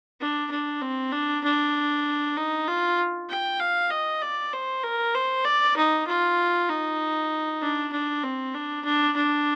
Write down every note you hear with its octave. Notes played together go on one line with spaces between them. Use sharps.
D4
D4
C4
D4
D4
D#4
F4
G5
F5
D#5
D5
C5
A#4
C5
D5
D#4
F4
D#4
D4
D4
C4
D4
D4
D4